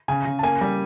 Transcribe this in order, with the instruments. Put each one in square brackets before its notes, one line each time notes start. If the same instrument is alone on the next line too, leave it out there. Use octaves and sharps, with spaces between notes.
[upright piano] C#3 G#5
C#3
A5
A#3 G#5
G3